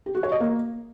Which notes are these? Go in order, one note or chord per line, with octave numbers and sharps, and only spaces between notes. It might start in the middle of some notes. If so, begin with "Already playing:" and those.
G4
F#4
C#5
D#5
A#3